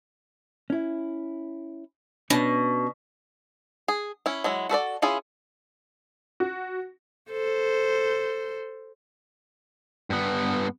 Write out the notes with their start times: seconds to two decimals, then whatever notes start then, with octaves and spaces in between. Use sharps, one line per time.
0.70 C#4 E4
2.30 B2 C#4 D4 C#5
3.88 G#4
4.26 C#4 E4
4.44 F#3 G#3 E4
4.69 F#4 A4 B4 D5
5.02 C#4 E4 F4 G#4
6.40 F#4
7.31 A4 C5
10.10 G2 B3